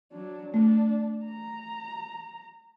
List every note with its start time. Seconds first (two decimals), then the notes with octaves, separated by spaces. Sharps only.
0.12 F#3 D4
0.54 A3 D4
1.25 A#5